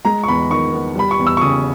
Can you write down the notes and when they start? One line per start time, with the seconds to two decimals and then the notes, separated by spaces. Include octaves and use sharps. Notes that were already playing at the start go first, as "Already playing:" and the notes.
0.05 G#3 A#5
0.24 C#6
0.28 E2 B5
0.50 D#3 C#6
0.73 B3
0.95 G3 B5
1.11 C#6
1.19 E2
1.27 E6
1.37 C#6
1.41 C#3 D#6